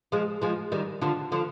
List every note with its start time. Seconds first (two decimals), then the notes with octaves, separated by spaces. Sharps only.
0.12 F3 G#3
0.42 F3 G#3
0.72 D#3 G3
1.01 D3 F3
1.32 D3 F3